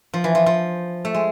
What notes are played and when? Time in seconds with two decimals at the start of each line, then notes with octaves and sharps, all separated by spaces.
0.14 F3
0.24 E3
0.35 F3
0.46 F3
1.05 A3
1.14 G#3